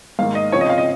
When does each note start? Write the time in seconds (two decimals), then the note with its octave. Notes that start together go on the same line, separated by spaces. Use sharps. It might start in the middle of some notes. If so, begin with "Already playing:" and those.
0.19 G#2 D#3 A#3 F5
0.35 D#5
0.52 C#3 F3 C4 C#5
0.61 D#5
0.70 F5
0.78 D#5